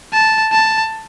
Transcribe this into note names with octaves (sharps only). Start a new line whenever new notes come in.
A5
A5